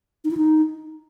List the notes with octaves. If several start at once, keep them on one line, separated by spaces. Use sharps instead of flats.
D#4
E4
D#4